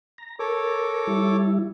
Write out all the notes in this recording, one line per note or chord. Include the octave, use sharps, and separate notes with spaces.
A#5
A4 A#4 C#5 D6
G3 E4